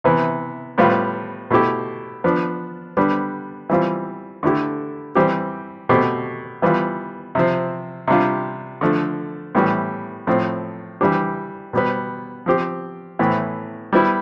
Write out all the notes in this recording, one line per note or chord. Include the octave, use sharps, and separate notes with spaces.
C3 E3 B3
A2 G3 B3 F4
B2 A3 E4 G4
F3 B3 D4
D3 G3 B3 D4
E3 G3 C4 F4
D3 A3 E4 G4
E3 G3 C4 G4
B2 A3 C4 G4
E3 G3 B3 F4
C3 F3 C4
C3 G3 D4 F4
D3 F3 A3
A2 E3 G3 B3
A2 F3 C4
E3 G3 D4 G4
B2 G3 B3
F3 C4 G4
A2 E3 B3
G3 B3 E4